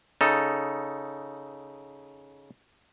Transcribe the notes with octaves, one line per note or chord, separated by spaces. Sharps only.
C#3 D#4 A4